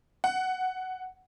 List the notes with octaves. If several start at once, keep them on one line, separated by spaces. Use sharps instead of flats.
F#5